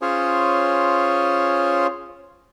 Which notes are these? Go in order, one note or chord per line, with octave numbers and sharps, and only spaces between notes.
C#4 F4 G#4 C5 C#5